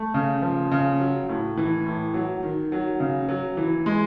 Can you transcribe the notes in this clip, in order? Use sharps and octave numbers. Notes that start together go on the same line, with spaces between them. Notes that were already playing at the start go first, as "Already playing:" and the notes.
Already playing: A3
C#3
F3
C#3
F#3
A2
E3
A2
F#3
D#3
F#3
C#3
F#3
E3
G#3